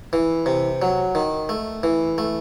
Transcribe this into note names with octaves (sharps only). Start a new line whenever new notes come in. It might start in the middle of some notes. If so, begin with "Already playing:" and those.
E3
C3
F#3
D#3
A3
E3
A3